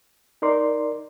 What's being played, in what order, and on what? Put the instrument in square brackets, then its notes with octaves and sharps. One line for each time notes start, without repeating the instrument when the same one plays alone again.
[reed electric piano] D#4 A#4 D5 C6